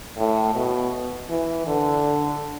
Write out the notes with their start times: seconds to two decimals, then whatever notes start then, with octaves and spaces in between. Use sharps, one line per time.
0.18 A2
0.55 B2
1.29 E3
1.67 D3